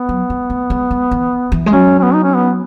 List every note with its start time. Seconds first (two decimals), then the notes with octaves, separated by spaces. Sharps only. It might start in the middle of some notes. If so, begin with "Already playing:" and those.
Already playing: B3
0.09 F#3
0.30 G#3
0.50 A3
0.70 G#3
0.91 G#3
1.11 E3
1.52 E3
1.66 G#3
1.73 F#3 C#4
1.99 C#4
2.03 B3
2.14 D#4
2.24 C#4
2.34 B3